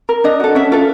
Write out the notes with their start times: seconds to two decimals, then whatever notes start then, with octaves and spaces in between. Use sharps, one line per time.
0.09 A#4
0.24 D4 D#5
0.40 F#4 A4
0.55 C#4 E5
0.72 F4 A4